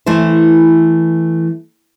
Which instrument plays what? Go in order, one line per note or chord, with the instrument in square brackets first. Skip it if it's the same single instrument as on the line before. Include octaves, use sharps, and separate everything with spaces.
[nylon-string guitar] E3 A3 E4 C5